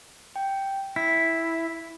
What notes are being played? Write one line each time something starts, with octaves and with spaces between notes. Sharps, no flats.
G5
E4 B6